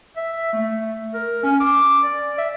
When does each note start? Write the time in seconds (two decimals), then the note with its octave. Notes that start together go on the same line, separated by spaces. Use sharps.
0.17 E5
0.53 A3
1.14 A#4
1.43 C#4
1.60 D6
2.03 D5
2.38 E5